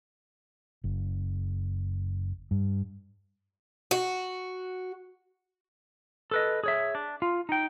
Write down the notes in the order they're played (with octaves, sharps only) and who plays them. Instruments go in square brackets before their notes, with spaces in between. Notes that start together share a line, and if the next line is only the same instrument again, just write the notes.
[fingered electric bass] F#1
G2
[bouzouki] F#4
[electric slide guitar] A4 B4 D#5
G#4 C#5 E5
D4
F4
D#4 G5